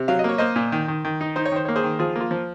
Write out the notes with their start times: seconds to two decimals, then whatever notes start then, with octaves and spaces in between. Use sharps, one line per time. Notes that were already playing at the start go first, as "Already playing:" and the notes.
Already playing: C3
0.08 F#3 F5
0.19 D#5
0.24 A#3 C#5
0.38 A#3 C5 D#5
0.56 A#2
0.72 D#3
0.88 D#3
1.05 D#3
1.21 D#4
1.36 D#4 C5
1.46 C#5
1.52 D#3 C5
1.65 A#3 C#5
1.76 G#4 C5
1.83 D#3
1.99 F3 F4 G#4
2.16 A#3 F4
2.31 F3